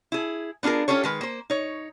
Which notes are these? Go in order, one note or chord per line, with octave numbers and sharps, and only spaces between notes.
E4 G#4
B3 D4 F4 G#4 A#4
C#4 F4 G4 A4 C#5
D#3 G#3 B4
A#3 C5
D#4 C#5